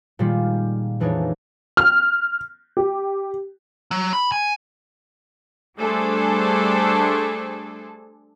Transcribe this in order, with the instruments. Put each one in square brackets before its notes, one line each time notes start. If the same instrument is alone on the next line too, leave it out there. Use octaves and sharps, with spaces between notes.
[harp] A#2 D#3 G3 G#3 F4
F2 E3 D4 D#4 G#4 C#5
[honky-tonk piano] F6
G4
[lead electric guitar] F#3
B5
G#5
[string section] G3 A3 D4 G#4 A4 C5